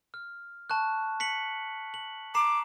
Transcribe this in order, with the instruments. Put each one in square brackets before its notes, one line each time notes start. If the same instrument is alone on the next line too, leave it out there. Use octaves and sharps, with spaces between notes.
[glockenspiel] F6
A5 C#6 F#6
B6 C#7 F#7
F#7
[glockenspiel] A#5 C7 E7 [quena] D6